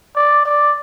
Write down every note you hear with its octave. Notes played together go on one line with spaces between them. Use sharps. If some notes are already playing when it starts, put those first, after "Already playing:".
D5
D5